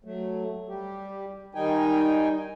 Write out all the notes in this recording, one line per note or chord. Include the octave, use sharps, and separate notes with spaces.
F#3 A3
G3 G4
D#3 G3 D#4 G5 G#5